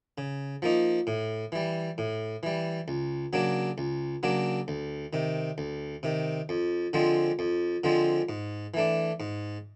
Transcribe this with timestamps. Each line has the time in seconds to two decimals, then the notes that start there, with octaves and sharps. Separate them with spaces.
0.18 C#3
0.62 F3 A#3 D#4
1.07 A2
1.52 E3 G3
1.98 A2
2.43 E3 G3
2.88 C#2
3.33 C#3 F#3 A#3 D4
3.78 C#2
4.23 C#3 F#3 A#3 D4
4.68 D2
5.13 C3 D#3
5.58 D2
6.03 C3 D#3
6.49 F2
6.93 D3 F3 G#3 C4
7.39 F2
7.84 D3 F3 G#3 C4
8.29 G#2
8.74 E3 A3 D4
9.20 G#2